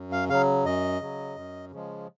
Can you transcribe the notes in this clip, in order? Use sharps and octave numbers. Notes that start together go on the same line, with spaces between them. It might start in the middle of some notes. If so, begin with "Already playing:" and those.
Already playing: F#2
F5
C#3 F#3 F5
F#2 D#5
C#3 F#3
F#2
C#3 F3 G#3